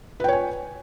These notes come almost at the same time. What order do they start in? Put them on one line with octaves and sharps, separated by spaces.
B4 G5 C#5 G#5